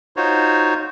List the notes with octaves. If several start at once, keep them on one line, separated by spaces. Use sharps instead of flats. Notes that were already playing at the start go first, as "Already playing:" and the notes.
D#4 F4 F#4 C5 C#5